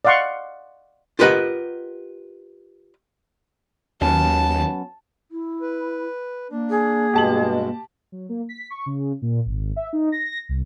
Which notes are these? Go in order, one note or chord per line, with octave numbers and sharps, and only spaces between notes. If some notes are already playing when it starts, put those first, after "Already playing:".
D5 D#5 F5 F#5 C6 C#6
F4 G4 A#4 B4 D#5 F#5
D#2 F#3 B3 C#4 A5
E4
B4
A#3 D4
G#4
G2 B2 G#3 G4 A5 F#7
F#3
A#3
B6
C#6
C#3
A#2
G#1
E5
D#4
A#6
C2